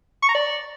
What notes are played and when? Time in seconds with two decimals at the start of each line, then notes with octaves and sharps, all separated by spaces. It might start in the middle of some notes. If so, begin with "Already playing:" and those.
0.23 C#6
0.29 A#5
0.35 D5